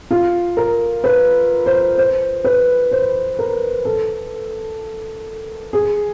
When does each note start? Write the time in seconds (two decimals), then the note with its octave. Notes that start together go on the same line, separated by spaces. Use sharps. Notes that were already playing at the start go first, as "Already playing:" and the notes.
0.11 F4
0.57 A#4
1.04 B4
1.66 C5
1.98 C5
2.44 B4
2.92 C5
3.39 A#4
3.85 A4
5.73 G#4